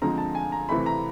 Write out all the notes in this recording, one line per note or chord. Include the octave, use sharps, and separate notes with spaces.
D3 F3 G#3 C4 A#5
A5
G#5
A#5
C3 E3 A3 B5
A#5